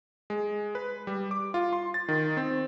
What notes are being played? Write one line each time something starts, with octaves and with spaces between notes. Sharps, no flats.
G#3
B4
G3
D6
F4
C6
A6
D#3
C4